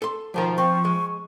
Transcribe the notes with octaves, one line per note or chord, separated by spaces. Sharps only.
A4 C6
B1 D#3 F3 A#4
C4 C#6
G#3